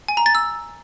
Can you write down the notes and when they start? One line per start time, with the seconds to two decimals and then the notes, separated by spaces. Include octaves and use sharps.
0.08 G#5
0.17 A#5
0.26 A6
0.35 E6